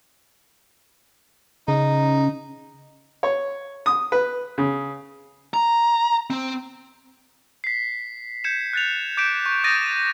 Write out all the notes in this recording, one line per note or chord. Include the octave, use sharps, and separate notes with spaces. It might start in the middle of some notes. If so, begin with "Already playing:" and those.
C#3 D#4
C#5
D#6
B4
C#3
A#5
C4
B6 C7
G6 G#6 C#7 E7
F#6 A6 F7
D6 G6 B6 D7 E7
C#6
D6 D#6 G6 A6 A#6 D#7